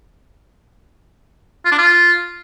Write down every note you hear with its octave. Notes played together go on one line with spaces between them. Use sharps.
F4
D4
F4